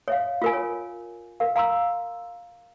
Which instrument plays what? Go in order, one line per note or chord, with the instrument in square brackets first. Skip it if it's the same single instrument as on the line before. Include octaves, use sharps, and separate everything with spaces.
[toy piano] C#5 E5 F5
F4 A#4 G#5
C#5
A#4 F5
F5 A#5 C6 E6